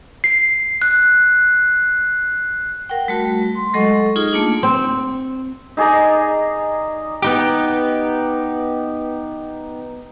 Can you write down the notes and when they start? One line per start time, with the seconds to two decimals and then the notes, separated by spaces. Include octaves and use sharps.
0.24 C7
0.82 F#6
2.89 A#4 F#5 G5
3.08 G3 A3 F#4
3.55 C6
3.74 F#3 G#3 A4 D#5 F#5 C#6
4.16 D#4 F4 G#4
4.33 A3 A#3 D4
4.63 C4
5.77 D#4 G#4 D5 A#5
7.22 B3 D#4 G4